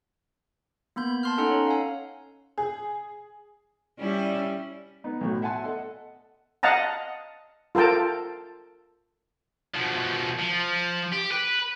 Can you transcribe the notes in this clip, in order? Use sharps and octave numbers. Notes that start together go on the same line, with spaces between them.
A#3 B3 B5 G6
A5 C6 F6
C#4 D#4 A4 F#5 A#5
C#5
F5 G#5
G#4
G3 C#4 E4
B3 D#4
B1 A2 F#3
E5 F#5 G#5 A5 C6
A4 D#5 F#5
D#5 F5 F#5 A5 A#5
F4 A4 A#4 G5 A5
B2 F3
F3
G4
B4